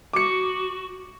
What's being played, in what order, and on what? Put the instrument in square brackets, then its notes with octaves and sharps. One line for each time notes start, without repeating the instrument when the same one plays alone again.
[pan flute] F#4 [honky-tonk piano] D6 C#7